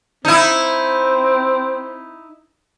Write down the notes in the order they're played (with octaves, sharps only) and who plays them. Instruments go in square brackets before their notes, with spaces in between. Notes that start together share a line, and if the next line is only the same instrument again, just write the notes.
[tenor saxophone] C4 [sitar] D#4 E4